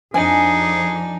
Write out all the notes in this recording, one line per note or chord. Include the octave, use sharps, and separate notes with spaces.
F2 F3 D4 D#4 G#4 G#5